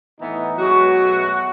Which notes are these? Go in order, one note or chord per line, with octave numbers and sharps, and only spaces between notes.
A2 E3 B3 D#4
B2 F#3 G#3 B3 F#4
B2 A3